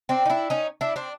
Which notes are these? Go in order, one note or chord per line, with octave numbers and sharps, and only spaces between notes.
C4 D4
D#4
D4 E4
C#4 D#4
D4 E4
C4 D4